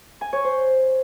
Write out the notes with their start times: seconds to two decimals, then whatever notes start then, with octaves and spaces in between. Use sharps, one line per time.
0.21 G#5
0.33 C#5
0.44 C5